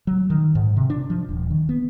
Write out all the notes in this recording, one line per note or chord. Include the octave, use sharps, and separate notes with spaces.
F#3
D#3
G#2
C3
D4
F3
D#1
D#3
B3